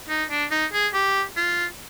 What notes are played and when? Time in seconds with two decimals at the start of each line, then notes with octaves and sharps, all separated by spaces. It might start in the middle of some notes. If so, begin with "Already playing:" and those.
0.09 D#4
0.30 D4
0.51 D#4
0.73 G#4
0.93 G4
1.36 F4